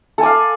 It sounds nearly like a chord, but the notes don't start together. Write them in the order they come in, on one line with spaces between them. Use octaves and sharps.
A4 G#5 D5 F5